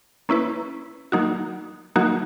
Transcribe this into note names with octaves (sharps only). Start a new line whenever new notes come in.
A#3 C#4 E4 B4
F#3 A#3 D#4 F#4
F#3 A#3 D#4 F#4